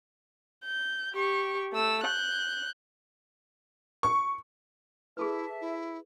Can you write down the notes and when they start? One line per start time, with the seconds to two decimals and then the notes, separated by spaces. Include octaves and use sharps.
0.65 G6
1.14 G4 C#6
1.73 A3 E6
2.04 F#6 G6
4.03 C#6
5.17 E4 G#4 A4 B4 E5 A5
5.61 E4